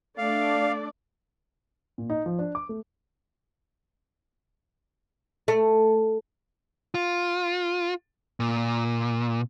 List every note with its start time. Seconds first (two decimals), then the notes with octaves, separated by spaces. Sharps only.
0.18 A3 D4 D5 F5
1.98 A#2
2.10 D#4
2.26 F3
2.39 D4
2.55 D6
2.69 A3
5.48 A3
6.94 F4
8.40 A#2